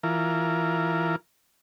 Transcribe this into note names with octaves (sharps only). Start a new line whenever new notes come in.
E3 F4 A#4